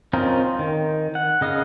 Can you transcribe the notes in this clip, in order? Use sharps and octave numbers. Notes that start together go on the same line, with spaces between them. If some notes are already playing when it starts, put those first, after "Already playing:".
C4 C#4 D#4 F4 A#4
D#3
F#5
C#3 D#5 F5 D#6